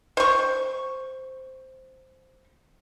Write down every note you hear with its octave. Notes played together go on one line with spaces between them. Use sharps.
C5 C#6